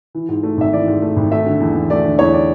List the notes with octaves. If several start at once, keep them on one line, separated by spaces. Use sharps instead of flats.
E3
G#2
A3
G#1 E5
E3 D5
G#2
A3
G#1
A3 E5
D3
E2
E2
A3 D5
D3
E2 C#5
D5